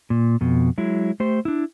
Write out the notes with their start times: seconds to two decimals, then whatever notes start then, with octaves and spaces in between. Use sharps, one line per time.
0.10 A#2
0.41 F2 B2
0.78 F#3 G#3 E4
1.20 A3 G4 C5
1.45 D4 E4